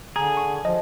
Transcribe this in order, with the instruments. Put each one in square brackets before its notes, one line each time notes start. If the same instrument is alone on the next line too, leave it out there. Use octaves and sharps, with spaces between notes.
[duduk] D3 [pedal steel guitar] G#4 [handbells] A#5
[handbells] C#6
[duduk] F3 [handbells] D#5